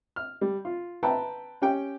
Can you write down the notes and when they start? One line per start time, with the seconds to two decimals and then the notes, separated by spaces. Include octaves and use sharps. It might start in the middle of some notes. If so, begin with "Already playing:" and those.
0.16 F6
0.41 G3
0.65 F4
1.03 B4 E5 G5 A5 A#5
1.62 C#4 G4 G5